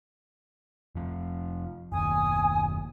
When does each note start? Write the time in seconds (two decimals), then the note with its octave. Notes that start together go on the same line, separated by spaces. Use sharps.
0.95 F1 F3
1.92 F#1 D#2 G#5 D#6